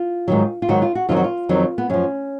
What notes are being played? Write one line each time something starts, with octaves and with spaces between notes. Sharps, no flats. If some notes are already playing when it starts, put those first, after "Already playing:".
Already playing: F4
G#2 D#3 F#3
F4
G#2 D#3 F#3 F#4
F4
F#4
F2 D#3 F#3 F4
F#4
F4
F2 D#3 F#3
B3
F#2 F3 C#4